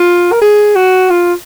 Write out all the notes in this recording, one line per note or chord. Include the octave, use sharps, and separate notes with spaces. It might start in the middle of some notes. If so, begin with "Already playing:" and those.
Already playing: F4
A#4
G#4
F#4
F4